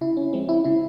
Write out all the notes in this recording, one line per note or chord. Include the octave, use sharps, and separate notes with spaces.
C#3 E4
C#4
F3 G#3 C4
E4
C#3 E4